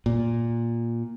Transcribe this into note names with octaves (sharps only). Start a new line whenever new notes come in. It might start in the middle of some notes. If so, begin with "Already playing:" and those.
A#2